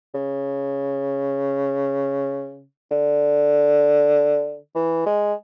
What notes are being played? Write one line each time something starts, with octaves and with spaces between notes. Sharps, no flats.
C#3
D3
E3
G#3